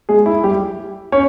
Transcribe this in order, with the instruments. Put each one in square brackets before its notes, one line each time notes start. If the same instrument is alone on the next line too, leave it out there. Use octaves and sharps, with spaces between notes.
[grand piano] G#3 G#4
E4
G3 G4
C#4 C#5